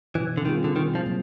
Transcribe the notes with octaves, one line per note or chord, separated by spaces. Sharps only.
B2 E3
D3
D#3 G3 C4 F4 G#4
D3
B2 D#3
F3
F#3 A#3